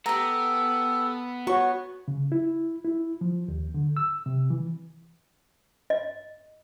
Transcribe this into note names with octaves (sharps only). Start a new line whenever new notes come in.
B3 G4 A4 A#5
F#4 C#5 C#6
C#3
E4
E4
F3
D#2
D3
E6
C3
E3
D#5